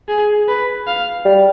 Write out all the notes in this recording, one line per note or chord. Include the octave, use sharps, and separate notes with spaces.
G#4
B4
F5
G3